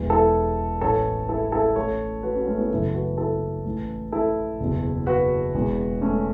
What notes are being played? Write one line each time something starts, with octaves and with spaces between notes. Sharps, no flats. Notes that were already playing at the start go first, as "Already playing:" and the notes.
Already playing: E1 E2 E3
E4 A4
A1 A2 E3 A4 C#5
E4 A4
E4 A4
A1 A2 E3 A4 C#5
F#4 B4
C#4 F#4
A3 C#4
B3 E4
F#1 F#2 C#3 E3 E4 A4
F#4 B4
E4 A4
A1 A2 E3
E4 A4
F#1 E2 B2
F#4 B4
E1 E2 E3
A3 C#4